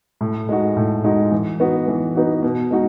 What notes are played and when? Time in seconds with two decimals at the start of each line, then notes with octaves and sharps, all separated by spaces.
0.21 A2
0.49 G#3 D#4 F#4
0.77 A2
1.04 G#3 D#4 F#4
1.32 E3
1.60 B3 D#4 F#4
1.88 E3
2.16 B3 D#4 F#4
2.43 B2
2.71 G#3 D#4 F#4